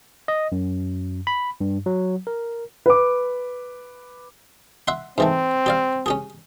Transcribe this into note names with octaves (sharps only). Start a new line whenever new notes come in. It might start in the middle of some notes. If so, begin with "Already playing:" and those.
D#5
F#2
B5
G2
F#3
A#4
B4 D6
E5 F#5 C6
G#2 E3 A3 C4
G4 D5 F5
C#4 G4 G#4